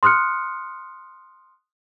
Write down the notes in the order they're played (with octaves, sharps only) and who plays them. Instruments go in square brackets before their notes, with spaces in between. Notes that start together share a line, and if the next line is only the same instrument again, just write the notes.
[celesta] C6 D#6 F6 F#6 C#7